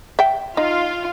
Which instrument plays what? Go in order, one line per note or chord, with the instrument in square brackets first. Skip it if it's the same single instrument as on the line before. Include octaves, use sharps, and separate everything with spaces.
[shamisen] E5 G5
[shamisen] D#4 [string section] F4